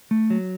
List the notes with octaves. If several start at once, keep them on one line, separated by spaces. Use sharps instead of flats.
A3
F#3